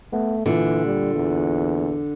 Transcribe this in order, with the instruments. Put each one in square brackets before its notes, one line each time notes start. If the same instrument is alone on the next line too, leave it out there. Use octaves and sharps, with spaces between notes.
[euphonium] A3 [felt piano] B3
[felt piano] A#2 [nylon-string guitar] D3 [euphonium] E3
[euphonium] G3
E2